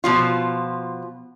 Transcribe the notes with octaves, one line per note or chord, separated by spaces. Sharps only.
B2 F3 F4